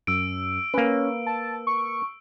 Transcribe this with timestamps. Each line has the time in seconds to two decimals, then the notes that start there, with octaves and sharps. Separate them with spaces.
0.07 F#2 E6 D7
0.74 A#3 C#4 B4
1.27 A5
1.67 C#6